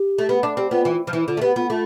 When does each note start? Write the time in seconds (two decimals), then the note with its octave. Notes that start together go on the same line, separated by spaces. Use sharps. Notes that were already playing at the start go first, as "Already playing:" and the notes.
Already playing: G4
0.18 A3
0.29 B3
0.43 D4
0.57 C4 G4
0.71 B3 F4
0.85 E3
1.07 F3
1.13 E3 E4
1.27 D3 F4
1.37 A3
1.41 B3 G4
1.56 B3 F4
1.70 A3 F4